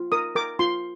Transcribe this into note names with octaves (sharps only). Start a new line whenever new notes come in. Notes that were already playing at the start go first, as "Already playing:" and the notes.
Already playing: F4
A#4 D#6
A#4 D6
F4 C6